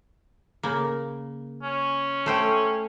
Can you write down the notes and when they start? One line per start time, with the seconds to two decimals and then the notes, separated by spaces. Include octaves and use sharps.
0.63 C#3 A#3
1.63 C#4
2.26 A3 C5 G5